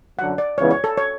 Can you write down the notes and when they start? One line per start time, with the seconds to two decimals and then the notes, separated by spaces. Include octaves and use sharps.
0.19 F#2 D3 F#3 F#5
0.38 D5
0.58 C#2 C#3 E3 B3 C#5
0.71 C#5
0.84 A4
0.97 C#5